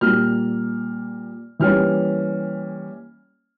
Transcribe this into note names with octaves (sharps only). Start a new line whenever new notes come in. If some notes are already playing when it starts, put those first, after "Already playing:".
A#2 G3 A#3 F6
E3 G3 A#3 C#4 F6